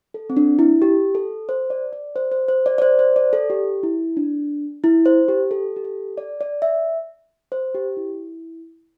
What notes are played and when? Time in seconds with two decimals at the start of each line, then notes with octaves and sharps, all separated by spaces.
0.14 A4
0.30 C4
0.37 D4
0.59 E4
0.82 G4
1.15 A4
1.49 C5
1.70 D5
1.93 D5
2.16 C5
2.32 C5
2.48 C5
2.66 D5
2.78 D5
2.82 C5
2.99 C5
3.16 D5
3.33 A4
3.50 G4
3.83 E4
4.17 D4
4.84 E4
5.06 C5
5.28 G4
5.51 A4
5.76 G4
5.84 A4
6.18 D5
6.41 D5
6.62 E5
7.52 C5
7.75 G4
7.97 E4